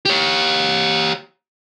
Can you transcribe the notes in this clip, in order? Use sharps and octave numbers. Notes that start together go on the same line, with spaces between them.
G4 C#5